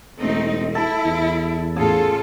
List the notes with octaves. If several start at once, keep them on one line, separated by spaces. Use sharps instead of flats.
E1 A3 C4 D#4
E4 A4
E2
A2 C#3 F4 G#4 A4 A5